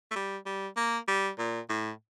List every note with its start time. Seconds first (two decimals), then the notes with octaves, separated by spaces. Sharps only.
0.11 A3
0.15 G3
0.46 G3
0.76 A#3
1.08 G3
1.38 A#2
1.69 A2